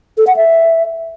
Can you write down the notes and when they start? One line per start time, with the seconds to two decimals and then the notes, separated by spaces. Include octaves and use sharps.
0.18 A4
0.27 F#5
0.36 E5